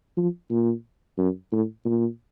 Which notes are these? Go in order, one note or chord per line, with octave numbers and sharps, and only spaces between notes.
F3
A#2
F#2
A2
A#2